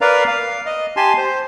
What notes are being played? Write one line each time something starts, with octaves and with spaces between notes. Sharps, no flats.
A#4 B4 D5 F5 A#5
F5
D#5
G4 G#5 A5 C6
C5